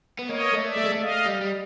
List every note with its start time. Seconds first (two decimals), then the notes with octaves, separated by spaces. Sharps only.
0.19 B3
0.29 A#3 C#5 D#5
0.53 A3
0.66 D5 E5
0.77 A3
0.85 G#3
0.92 A3
1.01 D#5 F5
1.26 G3
1.41 G3